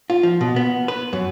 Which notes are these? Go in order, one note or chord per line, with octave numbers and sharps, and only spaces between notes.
F4
F3
B2
B3
B4
F#2